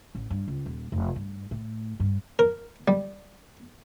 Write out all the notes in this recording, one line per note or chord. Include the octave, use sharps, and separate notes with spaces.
A1
G2
C#2
D#1
F1
G2
A2
G2
A#4
G3